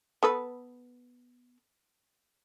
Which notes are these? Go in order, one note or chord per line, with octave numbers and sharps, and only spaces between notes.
B3 A4 B4